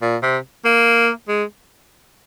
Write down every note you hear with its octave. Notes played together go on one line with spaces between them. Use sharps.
A#2
C3
A#3
G#3